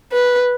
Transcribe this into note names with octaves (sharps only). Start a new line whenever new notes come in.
B4